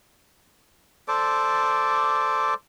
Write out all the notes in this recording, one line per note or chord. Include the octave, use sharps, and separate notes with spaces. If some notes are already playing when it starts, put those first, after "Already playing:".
A4 C5 D5 D6